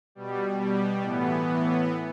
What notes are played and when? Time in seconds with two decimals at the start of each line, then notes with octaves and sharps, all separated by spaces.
0.15 B2 G3
0.58 B2 G3
1.01 A2 E3 B3
1.45 A2 E3